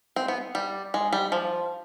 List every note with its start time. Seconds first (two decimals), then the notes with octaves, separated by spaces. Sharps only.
0.16 C4
0.28 B3
0.55 G3
0.94 G#3
1.13 G3
1.32 F3